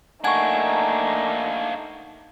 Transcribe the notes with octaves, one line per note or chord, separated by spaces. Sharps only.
A3 A#3 D4 D#4 F#5 G#5 C#6 G#6